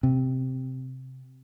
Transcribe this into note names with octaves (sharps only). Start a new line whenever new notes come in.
C3